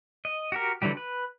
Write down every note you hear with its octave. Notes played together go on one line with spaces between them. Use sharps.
D#5
F#4 G4 A#4
D3 E3 F#3 G3 G4
B4